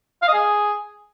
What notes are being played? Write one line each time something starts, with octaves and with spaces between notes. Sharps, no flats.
F5
D#5
G#4